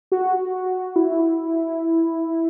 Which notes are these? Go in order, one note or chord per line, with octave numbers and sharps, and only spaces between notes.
F#4
E4